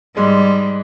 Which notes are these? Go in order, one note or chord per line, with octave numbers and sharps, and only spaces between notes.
G#2 G3 G#3